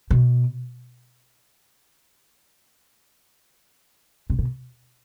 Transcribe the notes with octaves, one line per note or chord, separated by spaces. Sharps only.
B2
C3
B2